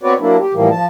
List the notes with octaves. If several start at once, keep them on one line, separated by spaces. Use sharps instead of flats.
B3 C4 F#4 B4 C#5 D5
F#3 A#3 D4 E4
G4
A2 E3 F3 G3 A#3
F3 A5